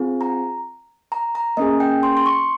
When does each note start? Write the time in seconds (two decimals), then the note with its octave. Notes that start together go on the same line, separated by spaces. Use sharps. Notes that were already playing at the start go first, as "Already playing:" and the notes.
Already playing: C4 F4 G#4
0.21 A#5
1.12 A#5
1.35 A#5
1.57 A#3 C#4 G#4 D#5
1.80 G5
2.03 C6
2.17 C6
2.26 C#6